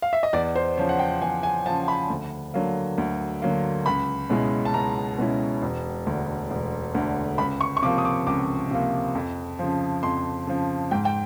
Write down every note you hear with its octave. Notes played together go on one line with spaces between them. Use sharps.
F5
E5
D#5
E2 D5
C5
C#3 F3 C#5
F#5
G5
E2 G#5
G#5
C#3 F3 A5
B5
D2
D3 F#3 A#3
D2
D3 F#3 A#3
C#2 B5
B2 G#3 C#4 E4
A5
C#2 A#5
B2 G#3 C#4 E4
E1
D2 D3
E1
D2 D3
C#2 B5
C#6
C#6
C3 F3 A#3 D6
D#6
D6
C#2 D6
C3 F3 A#3
F2
C#3 F3
F2 C6
C#3 F3
G#2 G5
G5